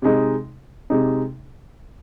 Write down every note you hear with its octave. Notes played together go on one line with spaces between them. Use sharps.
C3 G#3 D#4
C3 G#3 D#4